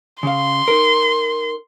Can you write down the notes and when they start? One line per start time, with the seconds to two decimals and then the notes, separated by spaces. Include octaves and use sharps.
0.23 C#3 F5 C6
0.68 D#4 A#4